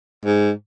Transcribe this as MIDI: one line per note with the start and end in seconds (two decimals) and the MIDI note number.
0.25 0.50 44